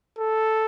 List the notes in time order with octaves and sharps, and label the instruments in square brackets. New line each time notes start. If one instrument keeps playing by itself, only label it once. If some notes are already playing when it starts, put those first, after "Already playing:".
[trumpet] A4